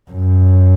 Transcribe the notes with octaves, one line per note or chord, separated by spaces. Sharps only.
F#2